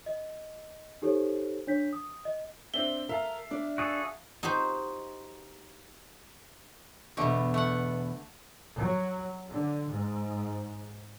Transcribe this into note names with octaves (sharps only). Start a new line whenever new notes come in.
D#5
D#4 G4 A4 C5 C#5
D4 C#5 G6 B6
D#6
D#5
C4 D4 E5 G7
A#4 E5 F5 A5
D4 D5
F#4 G#4 A4
D#4 F#4 G4 C5
E2 B2 D3 A3
A3 F#5
F#3
D3
G#2